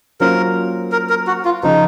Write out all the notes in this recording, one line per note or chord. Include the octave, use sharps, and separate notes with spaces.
F#3 A#3 C#4 F4 A#4 C5
A#4
A#4
F#4
F4
C#3 F3 D#4